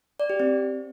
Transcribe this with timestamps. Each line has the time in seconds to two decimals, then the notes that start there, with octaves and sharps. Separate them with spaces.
0.20 D5
0.30 G4
0.40 C4